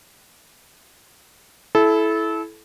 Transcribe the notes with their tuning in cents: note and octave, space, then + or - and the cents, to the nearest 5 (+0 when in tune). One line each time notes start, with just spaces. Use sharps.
E4 +0 A4 -25